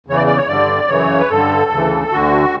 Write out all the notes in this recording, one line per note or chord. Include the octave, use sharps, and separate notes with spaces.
E2 C#3 E3 C#5
D5
D5
C#5
G2 D3 D5
F#2 C#3 E3 C#5
B4
G2 D3 A4
D2 C#3 E3
D2 D3 F#4